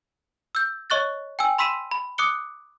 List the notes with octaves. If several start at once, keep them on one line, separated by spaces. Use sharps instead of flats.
E6 G6
C#5 D#5 C#6 F#6 A6
G5 G#5 E6
B5 C6 E6 B6 D#7 E7
B5
D6 D#6 F#6 C#7 G7